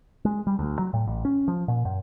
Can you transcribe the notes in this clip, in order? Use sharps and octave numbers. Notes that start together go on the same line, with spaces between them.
G#3
G3
D2
F#3
A2
A1
C#4
F3
A#2
F#2